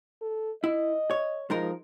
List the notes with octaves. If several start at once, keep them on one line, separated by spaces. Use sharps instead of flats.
A4
E4 D#5
C#5
F3 G#3 D#4 A#4